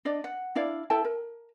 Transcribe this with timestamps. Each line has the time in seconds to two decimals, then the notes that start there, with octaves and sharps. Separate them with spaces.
0.05 D4 D5 D#5
0.24 F#5
0.55 D4 E4 D5 F5
0.90 E4 A4 G5 A5
1.05 A#4